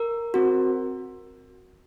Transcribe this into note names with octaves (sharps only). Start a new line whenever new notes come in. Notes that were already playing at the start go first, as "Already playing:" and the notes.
Already playing: A#4
C4 F#4